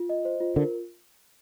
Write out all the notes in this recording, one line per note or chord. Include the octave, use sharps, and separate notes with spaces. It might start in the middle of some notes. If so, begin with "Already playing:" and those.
Already playing: F4
D#5
C5
F4
D3 A#4